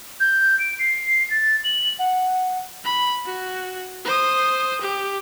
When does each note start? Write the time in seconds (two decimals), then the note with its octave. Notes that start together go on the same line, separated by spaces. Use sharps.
0.20 G6
0.59 D7
0.79 C7
1.30 A6
1.64 F#7
1.99 F#5
2.85 B5
3.25 F#4
4.05 C5 D#6
4.81 G4